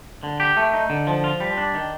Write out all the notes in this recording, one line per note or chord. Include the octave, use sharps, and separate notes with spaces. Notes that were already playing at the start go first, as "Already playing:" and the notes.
D3
G4
A3
D#4
D3
F3
F4
G3
D4
D#3